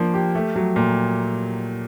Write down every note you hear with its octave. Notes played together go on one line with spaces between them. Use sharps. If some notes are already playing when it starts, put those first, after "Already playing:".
Already playing: F3 A#3 D4
G4
A3
F#3
A#2